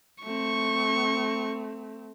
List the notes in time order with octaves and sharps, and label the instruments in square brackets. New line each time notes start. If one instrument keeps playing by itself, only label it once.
[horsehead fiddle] A3 C4 [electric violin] C#6